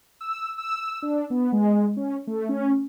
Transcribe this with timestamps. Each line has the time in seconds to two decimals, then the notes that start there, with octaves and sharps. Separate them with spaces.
0.21 E6
0.58 E6
1.02 D4
1.30 B3
1.52 G#3
1.97 C#4
2.27 A3
2.49 C#4